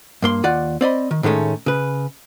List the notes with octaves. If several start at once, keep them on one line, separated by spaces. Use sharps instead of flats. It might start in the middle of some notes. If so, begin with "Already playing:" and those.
G2 A#3 C6
D#2 F4 D5 F#5
C4 D5 D#5 B5
D#3
A2 D#3 G#3 A3 C#4
C#3 B4